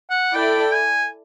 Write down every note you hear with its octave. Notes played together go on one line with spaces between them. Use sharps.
F#5
E4 A4 D5 G5
G#5